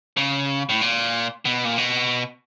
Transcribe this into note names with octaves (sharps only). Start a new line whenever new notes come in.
C#3
A2
A#2
B2
A#2
B2